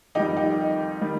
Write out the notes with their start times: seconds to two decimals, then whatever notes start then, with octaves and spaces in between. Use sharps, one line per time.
0.15 F2 D#3 G3 D#4 G4
0.37 D#4 G4
1.01 D#3 G3